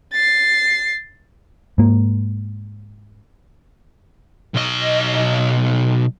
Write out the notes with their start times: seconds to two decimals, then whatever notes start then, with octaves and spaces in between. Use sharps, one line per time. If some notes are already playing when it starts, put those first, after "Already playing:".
0.13 A6 C7
1.78 G#2 A#3
4.55 B1 D#5